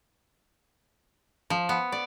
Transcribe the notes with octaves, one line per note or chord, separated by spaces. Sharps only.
F3
B3
D5